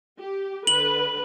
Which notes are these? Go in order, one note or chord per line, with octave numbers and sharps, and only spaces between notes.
G4
D3 B4 F#7